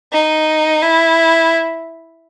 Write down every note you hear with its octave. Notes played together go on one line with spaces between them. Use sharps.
D#4
E4